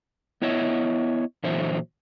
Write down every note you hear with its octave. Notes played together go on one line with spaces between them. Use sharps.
B3 E4 C#5 D#5 E5
A#2 D3 E3 F#3 C5 E5